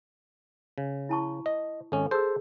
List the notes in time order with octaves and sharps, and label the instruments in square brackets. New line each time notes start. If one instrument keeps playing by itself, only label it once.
[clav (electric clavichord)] C#3
[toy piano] E4 A5 C#6
[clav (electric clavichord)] D#5
[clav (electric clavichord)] G#1 C#4 [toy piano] A4
[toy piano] G#4 E6 [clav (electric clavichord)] A4 C5